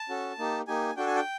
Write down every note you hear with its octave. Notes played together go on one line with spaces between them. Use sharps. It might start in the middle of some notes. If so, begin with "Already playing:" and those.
Already playing: A5
C#4 F#4 A4
A#3 D#4 G4
A#3 D#4 G4 G#5
D4 F#4 A4 G5
G#5
G5